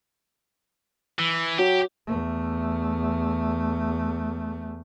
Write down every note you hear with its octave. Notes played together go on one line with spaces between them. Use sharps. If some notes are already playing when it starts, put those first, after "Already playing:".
E3
F#3 G4
E2 A3